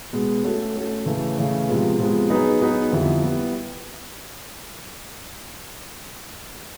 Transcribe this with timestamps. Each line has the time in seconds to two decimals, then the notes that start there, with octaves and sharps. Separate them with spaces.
0.13 B2 G#3 B3
0.43 A3 C#4 F#4 A4
0.75 A3 C#4 F#4 A4
1.06 C#3 E3 A3
1.37 C#3 E3 A3
1.68 C3 F3 G#3 B3
1.99 C3 F3 G#3 B3
2.30 F#3 B3 D#4 G#4 B4
2.61 F#3 B3 D#4 G#4 B4
2.92 F2 D3 G3 B3 E4
3.23 G3 B3 E4